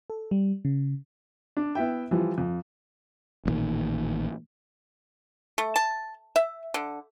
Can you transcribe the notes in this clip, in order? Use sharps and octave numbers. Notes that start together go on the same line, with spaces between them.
A4
G3
C#3
D4
B3 E4 E5 G5
E3 F3 G3
F2
A1 G2 A#2 D#3
A3
A5
E5
D3